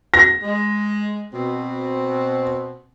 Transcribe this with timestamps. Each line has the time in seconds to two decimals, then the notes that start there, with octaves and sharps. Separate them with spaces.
0.14 A#6
0.43 G#3
1.33 B2 C4